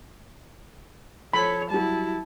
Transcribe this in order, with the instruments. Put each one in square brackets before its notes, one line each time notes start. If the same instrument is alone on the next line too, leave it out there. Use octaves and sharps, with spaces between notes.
[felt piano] F3 [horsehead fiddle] A4 C#5 [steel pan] B5
[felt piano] F#3 G3 [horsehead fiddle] E4 A5